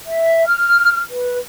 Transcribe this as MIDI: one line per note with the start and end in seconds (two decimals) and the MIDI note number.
0.06 0.43 76
0.47 0.99 89
1.11 1.37 71